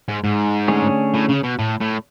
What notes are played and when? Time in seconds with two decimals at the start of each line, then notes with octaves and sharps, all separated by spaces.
0.09 G#2
0.24 G#2
0.68 D3 A3 C#4 G#4 C#5
1.14 A2
1.29 C#3
1.43 B2
1.59 A2
1.81 A2